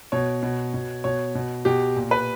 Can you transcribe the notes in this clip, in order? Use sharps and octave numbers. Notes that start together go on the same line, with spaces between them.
B2 C#5
B2
B2
B2 C#5
B2
B2 G4
A#2
B4